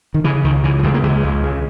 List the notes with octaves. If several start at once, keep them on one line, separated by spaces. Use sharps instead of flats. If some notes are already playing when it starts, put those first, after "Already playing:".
D#3
C#3 E3
C#2 D#3
C#3 E3
E3
C#2 G3
A#3
C#2 G#3
C#2
C#3